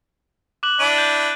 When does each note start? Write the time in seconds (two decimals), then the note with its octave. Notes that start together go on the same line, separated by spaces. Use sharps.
0.63 D6 F#6 F#7
0.80 D4 E4 D7 D#7
0.98 G6